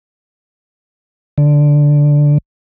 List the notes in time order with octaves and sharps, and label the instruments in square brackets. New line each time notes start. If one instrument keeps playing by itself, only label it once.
[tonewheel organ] D3